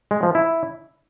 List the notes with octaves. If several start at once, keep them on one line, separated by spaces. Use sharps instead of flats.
G#3
F3
E4